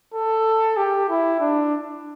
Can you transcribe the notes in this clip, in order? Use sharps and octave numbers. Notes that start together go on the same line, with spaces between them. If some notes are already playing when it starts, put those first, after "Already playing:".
A4
G4
E4
D4